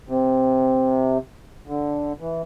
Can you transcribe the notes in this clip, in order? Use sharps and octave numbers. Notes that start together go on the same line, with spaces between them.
C3
D3
E3